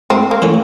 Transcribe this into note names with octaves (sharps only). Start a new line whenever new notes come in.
G#2 C4
A#3
E3 A3 C#4